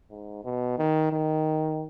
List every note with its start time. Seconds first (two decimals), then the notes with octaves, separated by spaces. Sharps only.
0.11 G#2
0.44 B2
0.78 D#3
1.12 D#3